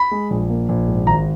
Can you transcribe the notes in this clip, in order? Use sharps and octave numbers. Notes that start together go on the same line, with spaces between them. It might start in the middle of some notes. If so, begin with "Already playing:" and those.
Already playing: B5
G#3
A#1
A#3
A#1
G#2
G#1 A#5